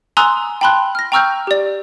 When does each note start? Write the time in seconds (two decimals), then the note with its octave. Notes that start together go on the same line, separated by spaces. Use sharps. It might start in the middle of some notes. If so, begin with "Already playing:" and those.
0.17 G#5 A#5 C6 D#6 E6 F#6
0.61 G5 A5 B5 C6 F#6
0.95 F6 A#6
1.12 G5 A#5 C#6 E6 F6 G6
1.47 G4 D5